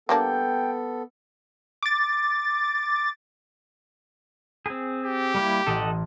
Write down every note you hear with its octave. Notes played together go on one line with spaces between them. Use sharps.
G3 A#3 B3 D4 A4 G5
D6 A6
C4 G#4
G4
G3 A#3 E4
A1 A4 D#5 F#5